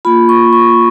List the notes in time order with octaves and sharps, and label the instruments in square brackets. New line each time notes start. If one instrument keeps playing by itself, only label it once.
[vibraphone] A#3 F4 B5
C#6
C#6